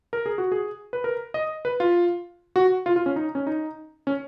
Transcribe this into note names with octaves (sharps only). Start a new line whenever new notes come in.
A#4
G#4
F#4
G#4
B4
A#4
D#5
B4
F4
F#4
F4
F4
C#4
D#4
C#4
D#4
C#4